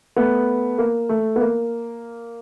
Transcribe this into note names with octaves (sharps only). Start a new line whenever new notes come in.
A3 B3
A#3
A3
B3
A#3